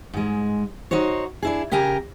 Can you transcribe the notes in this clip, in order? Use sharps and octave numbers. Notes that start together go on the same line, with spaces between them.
G#2 G#3
D#4 F#4 C5 C#5
D4 E4 G#4
C#3 G4 A#4 G#5 A#5